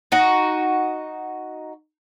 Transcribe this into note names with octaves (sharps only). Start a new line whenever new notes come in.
D#4 F#4